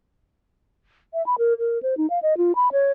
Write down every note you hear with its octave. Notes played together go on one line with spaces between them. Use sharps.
E5
B5
A#4
A#4
C5
D#4
F5
D#5
F4
B5
C#5